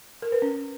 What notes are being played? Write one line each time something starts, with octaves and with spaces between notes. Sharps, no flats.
A#4
B4
C#4